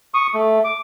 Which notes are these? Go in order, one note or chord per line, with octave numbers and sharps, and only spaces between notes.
C#6 D#6
A3
D6